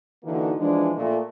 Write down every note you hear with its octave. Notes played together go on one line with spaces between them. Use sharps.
D3 E3 A#3 D#4 F#4
E3 F3 G#3 D4
A#2 A3